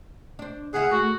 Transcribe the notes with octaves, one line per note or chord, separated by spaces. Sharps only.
D4 C5
C#3 E4 G#4 F5 F#5
A3 F#4